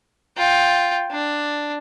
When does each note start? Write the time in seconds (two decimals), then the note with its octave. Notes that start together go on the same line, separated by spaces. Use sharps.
0.37 F4 G5
1.11 D4